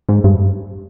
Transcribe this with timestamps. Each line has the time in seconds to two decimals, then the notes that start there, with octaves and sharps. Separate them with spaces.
0.09 G#2
0.24 G2